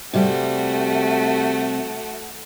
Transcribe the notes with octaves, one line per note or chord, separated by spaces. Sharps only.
C3 G3 A3 F#4